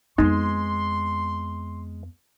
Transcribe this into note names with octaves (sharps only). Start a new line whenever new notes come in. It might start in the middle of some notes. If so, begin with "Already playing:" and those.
F2 G#3 B3 D#4 C6